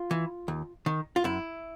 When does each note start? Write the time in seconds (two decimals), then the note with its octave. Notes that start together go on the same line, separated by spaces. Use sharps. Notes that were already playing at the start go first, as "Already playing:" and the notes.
Already playing: F4
0.11 E3
0.48 D#2
0.86 D#3
1.16 F4
1.24 F#2 E4